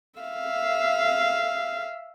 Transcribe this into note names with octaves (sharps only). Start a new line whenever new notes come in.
E5 F5